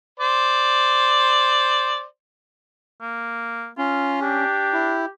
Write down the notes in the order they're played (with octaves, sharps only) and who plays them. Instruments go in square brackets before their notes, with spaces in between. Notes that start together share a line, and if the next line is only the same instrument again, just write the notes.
[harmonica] C5 D5
[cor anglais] A#3
[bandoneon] C#4 [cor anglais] F4
[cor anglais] D4 [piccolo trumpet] G4
[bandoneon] E4